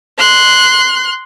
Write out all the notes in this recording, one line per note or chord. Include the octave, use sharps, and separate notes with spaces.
C6 F#6